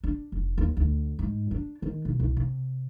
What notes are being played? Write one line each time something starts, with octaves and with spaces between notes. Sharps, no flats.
D4
F1
D#2
D2
G#2
D4
D#3
B2
C2
C3